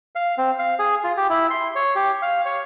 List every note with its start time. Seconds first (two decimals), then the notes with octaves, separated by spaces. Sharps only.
0.15 F5
0.38 C4
0.59 F5
0.79 G#4
1.04 F4
1.17 G4
1.30 E4
1.51 C6
1.76 C#5
1.96 G4
2.22 F5
2.46 C#5